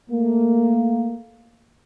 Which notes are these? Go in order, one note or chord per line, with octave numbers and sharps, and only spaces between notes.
A3 A#3